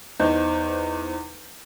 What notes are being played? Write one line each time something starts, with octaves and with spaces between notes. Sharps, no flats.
E2 D#4 C5 G6